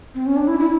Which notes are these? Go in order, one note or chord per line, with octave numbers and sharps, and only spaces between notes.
C4
C#4
D4
E4
E4